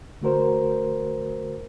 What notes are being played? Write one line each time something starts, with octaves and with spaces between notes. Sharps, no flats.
D3 A3 F#4 A#4 C5